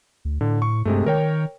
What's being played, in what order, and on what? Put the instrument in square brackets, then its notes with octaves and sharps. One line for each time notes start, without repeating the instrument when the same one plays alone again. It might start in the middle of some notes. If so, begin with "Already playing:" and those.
[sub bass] D2
[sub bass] A2 [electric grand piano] D3
[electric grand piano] C#6
[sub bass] G2 [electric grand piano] C3 G#3 A3
[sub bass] D#3 [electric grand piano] A#4 C#5 G5